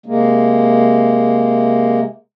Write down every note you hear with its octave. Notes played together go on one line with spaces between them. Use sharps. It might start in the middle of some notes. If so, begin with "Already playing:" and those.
C3 G#3 A#3